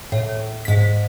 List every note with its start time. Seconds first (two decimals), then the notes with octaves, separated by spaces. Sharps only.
0.12 A2
0.65 G#2 B6